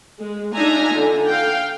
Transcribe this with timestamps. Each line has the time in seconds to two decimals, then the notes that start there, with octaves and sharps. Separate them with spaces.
0.20 G#3
0.55 D4 D#4 F4 E5 G#5 A#5
0.95 D3
1.28 F5 G5